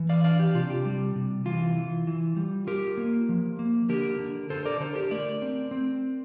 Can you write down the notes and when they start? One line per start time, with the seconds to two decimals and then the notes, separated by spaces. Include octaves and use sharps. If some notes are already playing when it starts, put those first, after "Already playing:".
Already playing: E3
0.09 D5 F5
0.24 D4 D5 F5
0.40 G4
0.55 C3 F4
0.70 G4
0.85 G3
1.15 C3
1.45 E3 F4
1.77 E3
2.07 E3
2.37 G3
2.67 F4 G4 A#4
2.97 A#3
3.29 F3
3.59 A#3
3.89 D3 G4 A#4
4.19 D3
4.50 D3 A4 C5
4.65 A#4 D5
4.80 D3 A4 C5
4.96 G4 A#4
5.11 A3 A#4 D5
5.42 C4
5.71 C4